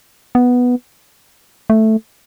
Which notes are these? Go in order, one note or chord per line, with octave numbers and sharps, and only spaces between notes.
B3
A3